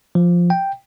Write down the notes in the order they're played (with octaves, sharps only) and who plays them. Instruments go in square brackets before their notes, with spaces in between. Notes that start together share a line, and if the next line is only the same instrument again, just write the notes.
[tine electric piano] F3
G5